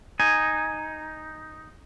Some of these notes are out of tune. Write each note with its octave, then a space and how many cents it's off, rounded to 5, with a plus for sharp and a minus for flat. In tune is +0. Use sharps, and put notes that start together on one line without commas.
D#4 +0 G#5 +0